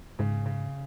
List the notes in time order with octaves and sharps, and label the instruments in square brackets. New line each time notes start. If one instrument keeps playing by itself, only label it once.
[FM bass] G#2 [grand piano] C#3
[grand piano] C#3